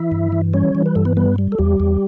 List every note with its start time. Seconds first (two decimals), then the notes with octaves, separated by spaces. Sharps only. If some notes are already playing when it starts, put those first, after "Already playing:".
Already playing: E3 E4 E5
0.12 G2
0.32 E3
0.54 G3 C#4 C#5
0.75 E3
0.86 B4
0.95 G2 A4
1.05 B3 B4
1.17 G3 B3 B4
1.38 G3
1.52 A4
1.59 E2 G3 G4
1.80 E2